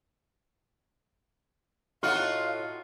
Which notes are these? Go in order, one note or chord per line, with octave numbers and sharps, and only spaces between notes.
A2 D#4 F4 F#4 F5 F6